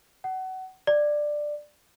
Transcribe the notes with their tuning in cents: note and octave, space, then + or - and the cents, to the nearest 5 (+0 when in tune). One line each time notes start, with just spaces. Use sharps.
F#5 +25
D5 +10